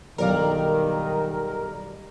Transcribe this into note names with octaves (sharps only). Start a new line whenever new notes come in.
B1 G2 D#3 G3 A#4 D5 F5